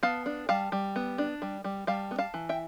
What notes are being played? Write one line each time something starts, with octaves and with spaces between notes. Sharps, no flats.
B3 F5 A5
D4
G3 F5 A5
G3
B3
D4
G3
G3
G3 F5 A5
B3
F5 A5
E3
E5 G5